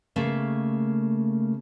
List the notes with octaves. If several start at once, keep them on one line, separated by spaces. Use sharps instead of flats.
C#3 A3 A#3